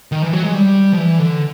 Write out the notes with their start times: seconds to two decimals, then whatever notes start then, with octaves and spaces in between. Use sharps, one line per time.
0.12 D#3
0.23 E3
0.33 F#3
0.44 G#3
0.54 G3
0.93 F3
0.98 E3
1.19 D3